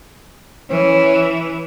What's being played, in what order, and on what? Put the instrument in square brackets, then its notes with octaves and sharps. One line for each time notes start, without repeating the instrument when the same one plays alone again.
[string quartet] E3 [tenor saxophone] C#4